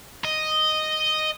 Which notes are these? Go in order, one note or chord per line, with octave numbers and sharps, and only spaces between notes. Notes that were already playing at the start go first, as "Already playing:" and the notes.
D#5